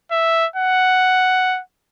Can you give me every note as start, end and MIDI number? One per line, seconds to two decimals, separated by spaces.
0.11 0.46 76
0.56 1.60 78